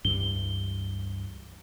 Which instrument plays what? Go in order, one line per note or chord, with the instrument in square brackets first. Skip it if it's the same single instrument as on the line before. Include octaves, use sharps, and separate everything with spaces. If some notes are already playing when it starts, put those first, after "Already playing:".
[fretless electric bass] C#2 G2 E3 [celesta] G7